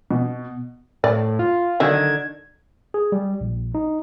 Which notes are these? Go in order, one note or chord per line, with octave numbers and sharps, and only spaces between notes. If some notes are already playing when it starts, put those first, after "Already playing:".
B2
A2 D5
F4
D3 D#3 F#3 G#6
G#4
G3
A#1
D#4